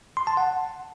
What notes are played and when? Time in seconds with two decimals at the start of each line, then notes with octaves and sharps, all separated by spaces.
0.17 C6
0.27 A5
0.37 F#5